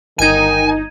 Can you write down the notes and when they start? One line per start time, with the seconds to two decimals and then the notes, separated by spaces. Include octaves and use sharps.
0.19 G1 D#3 D#4 G#5 G#6 D#7